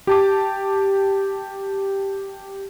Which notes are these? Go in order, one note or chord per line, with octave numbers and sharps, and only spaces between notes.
G4 A5 D6